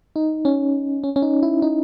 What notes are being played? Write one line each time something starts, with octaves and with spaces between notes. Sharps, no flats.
D#4
C#4
C#4
C#4
D#4
E4
D#4